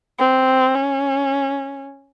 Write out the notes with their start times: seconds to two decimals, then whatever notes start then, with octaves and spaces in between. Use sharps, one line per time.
0.19 C4
0.75 C#4